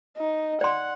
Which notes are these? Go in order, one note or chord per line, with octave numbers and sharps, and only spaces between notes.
D#4
D5 F#5 C6